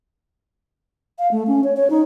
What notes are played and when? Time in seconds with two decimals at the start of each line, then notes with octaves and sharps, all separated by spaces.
1.19 F5
1.32 A3
1.47 C#4
1.64 C#5
1.77 C#5
1.90 D#4